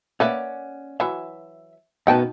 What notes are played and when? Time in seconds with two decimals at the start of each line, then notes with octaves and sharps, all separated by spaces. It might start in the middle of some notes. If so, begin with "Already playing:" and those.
0.20 A#3 C#4 B4 D5 E5 F#5
1.00 E3 F#3 E5
2.07 F#2 B2 B3 D#4 G5 A5